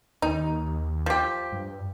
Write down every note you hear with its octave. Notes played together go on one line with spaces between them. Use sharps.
D#2 D#4
F3 G4
G2